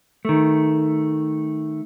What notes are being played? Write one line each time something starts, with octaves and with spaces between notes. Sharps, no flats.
D#3 A3